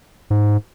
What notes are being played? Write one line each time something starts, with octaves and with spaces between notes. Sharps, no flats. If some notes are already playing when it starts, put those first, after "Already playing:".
G#2